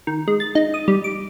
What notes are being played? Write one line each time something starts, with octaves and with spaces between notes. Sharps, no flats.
D#3
G#3
A6
D#4
D#6
G3
D6